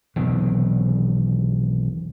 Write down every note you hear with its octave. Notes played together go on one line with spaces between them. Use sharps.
E1 B1 C3 D#3